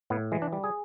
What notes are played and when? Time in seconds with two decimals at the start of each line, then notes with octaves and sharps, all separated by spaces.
0.10 A2 B3
0.32 E3 G#3
0.42 D4
0.53 G3
0.64 G#4